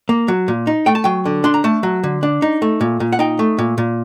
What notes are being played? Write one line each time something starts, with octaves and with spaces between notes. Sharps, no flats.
A#3
F#3
A#2
D#4
A3 G5
A5
F#3 G5
D3
D4 C6
A#5
A3 A5
F#3
D3
D4
D#4
A3
A#2
A#2
F#5
D#4 G5
A3
A#2
A#2